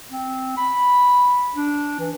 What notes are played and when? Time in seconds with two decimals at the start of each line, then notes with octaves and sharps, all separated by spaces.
0.11 C4
0.57 B5
1.55 D4
2.00 E3